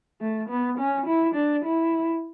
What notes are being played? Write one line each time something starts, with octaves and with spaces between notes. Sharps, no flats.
A3
B3
C#4
E4
D4
E4